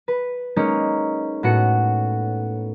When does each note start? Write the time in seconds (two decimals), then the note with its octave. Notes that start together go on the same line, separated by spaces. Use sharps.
0.08 B4
0.56 G#3 A#3 C#4 D#4
1.43 A2 B3 F#4 C#7